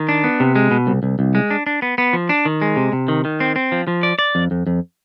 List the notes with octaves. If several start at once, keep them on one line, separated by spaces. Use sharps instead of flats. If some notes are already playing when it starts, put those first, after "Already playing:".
Already playing: D#3
D4
B3
C3
G#3
B2
C2
C2
C2
G#3
D4
D4
B3
B3
F3
D4
D#3
G#3
C3
C3
D#3
D#3
C4
C4
F3
F3
D5
D5
F2
F2
F2